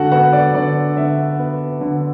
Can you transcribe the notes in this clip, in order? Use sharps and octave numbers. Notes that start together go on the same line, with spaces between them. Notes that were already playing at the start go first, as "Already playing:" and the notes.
Already playing: D3 F#4 A4 F#5
B3 F#4 F#5
D5
D3 D5
D3 E5
B3
D3